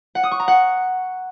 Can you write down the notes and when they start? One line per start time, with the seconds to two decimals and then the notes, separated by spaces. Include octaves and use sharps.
0.15 F#5
0.23 D#6
0.31 C#6
0.40 A#5
0.48 F#5